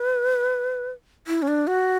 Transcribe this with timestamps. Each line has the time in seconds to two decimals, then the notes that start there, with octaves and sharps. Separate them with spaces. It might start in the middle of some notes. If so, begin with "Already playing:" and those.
Already playing: B4
1.27 E4
1.42 C#4
1.48 D4
1.67 F#4